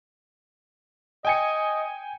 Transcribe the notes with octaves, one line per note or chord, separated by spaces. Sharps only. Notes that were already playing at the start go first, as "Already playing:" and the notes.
D#5 G5 G#5 C#7